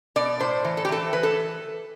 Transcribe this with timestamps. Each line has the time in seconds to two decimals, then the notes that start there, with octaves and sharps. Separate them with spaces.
0.16 B2 D5
0.40 A2 C5
0.64 E3
0.77 A4
0.85 G4
0.89 E3 A4
1.13 E3 B4
1.23 A4